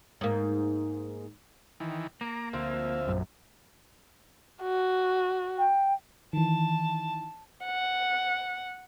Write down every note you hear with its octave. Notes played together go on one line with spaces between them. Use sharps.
G#2 A#3
D#3 E3
A#3 A#5 D6
D2 F3 C4 E5 F5
A#1 F#2
F#4
G5
D#3 E3 A5
F#5